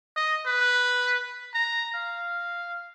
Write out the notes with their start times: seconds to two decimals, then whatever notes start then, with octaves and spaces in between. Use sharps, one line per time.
0.16 D#5
0.46 B4
1.54 A#5
1.94 F5